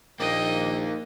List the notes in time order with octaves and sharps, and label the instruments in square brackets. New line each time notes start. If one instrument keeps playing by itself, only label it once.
[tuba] A#1 [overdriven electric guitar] A#3 D#4 [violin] D#5 G5